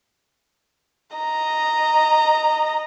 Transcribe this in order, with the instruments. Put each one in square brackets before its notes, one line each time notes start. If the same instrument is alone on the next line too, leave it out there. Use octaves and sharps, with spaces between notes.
[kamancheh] D#5 A#5